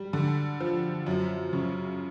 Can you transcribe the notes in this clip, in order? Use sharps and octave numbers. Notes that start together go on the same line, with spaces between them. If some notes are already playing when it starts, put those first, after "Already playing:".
Already playing: G3
D3
F3
F#2
C#3